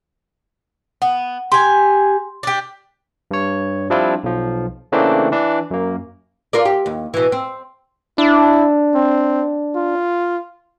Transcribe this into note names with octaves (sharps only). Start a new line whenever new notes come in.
B3 F#5
G4 G#5 C6
D4 G4
G2 C#5
F3 G3 C4 D4 E4 F4
B1 F3
C#3 E3 A3 A#3 C4 D4
E3 D4
F#2 A#3
F4 A#4 D5
G4
D#2
B2 E3
C4
D4 E4
C4
F4